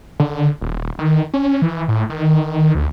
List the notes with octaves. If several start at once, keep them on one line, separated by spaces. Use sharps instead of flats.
D3
D#1
D#3
C#4
E3
A2
D#3
D2